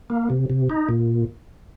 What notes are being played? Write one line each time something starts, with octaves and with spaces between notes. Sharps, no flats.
A#3
C3
C3
D#4
A#2